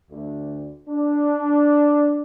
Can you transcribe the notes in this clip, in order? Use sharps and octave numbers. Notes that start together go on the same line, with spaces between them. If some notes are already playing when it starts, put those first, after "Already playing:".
D2
D4